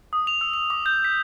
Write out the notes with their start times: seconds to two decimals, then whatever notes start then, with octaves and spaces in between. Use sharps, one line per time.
0.13 D#6
0.27 F7
0.41 E6
0.54 F7
0.70 D6
0.86 G6
1.05 B6